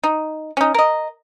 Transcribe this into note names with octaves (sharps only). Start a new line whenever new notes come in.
D#4
C#4 D#4
A#4 D#5